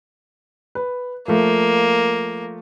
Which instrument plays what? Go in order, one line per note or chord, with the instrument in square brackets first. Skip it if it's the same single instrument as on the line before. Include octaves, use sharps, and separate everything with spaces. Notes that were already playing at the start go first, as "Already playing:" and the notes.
[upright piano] B4
[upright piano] F3 A3 [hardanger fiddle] A#3